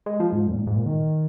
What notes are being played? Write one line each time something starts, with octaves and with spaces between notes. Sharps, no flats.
G#3
F3
G#2
F2
A#2
G#2
G#2
A#2
D#3